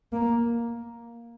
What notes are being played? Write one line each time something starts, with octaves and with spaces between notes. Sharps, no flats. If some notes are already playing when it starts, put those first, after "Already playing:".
A#3